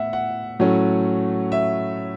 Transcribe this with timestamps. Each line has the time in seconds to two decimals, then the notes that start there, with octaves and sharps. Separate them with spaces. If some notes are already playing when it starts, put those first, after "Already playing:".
Already playing: A2 B3 E5 F#5
0.13 F#5
0.59 A2 F#3 A3 C#4
1.52 E5